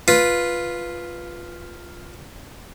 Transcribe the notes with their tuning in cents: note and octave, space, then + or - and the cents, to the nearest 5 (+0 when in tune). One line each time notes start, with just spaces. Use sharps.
F4 +0 B4 -5